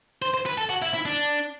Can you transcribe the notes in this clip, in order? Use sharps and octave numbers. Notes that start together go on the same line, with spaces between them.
C5
C5
B4
A4
F#4
E4
E4
D4